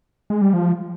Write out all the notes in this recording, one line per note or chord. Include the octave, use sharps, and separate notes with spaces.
G#3
G3
F3